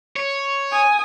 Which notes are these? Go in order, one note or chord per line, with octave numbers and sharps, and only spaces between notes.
C#5
G#5 D#6